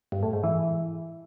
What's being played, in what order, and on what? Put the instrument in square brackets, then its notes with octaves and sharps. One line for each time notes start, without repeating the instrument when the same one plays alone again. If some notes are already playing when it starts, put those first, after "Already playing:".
[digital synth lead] G2
A2
G#2
E3